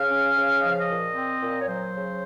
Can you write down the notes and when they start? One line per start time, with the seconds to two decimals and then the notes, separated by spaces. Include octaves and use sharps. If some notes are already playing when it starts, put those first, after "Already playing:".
Already playing: C#3 F5
0.09 C#4
0.35 C#3
0.61 F3 D#5
0.71 F5
0.79 D#5
0.88 A#2
1.15 C4
1.40 A#2
1.60 C#5
1.67 F#3 C5
1.94 C#3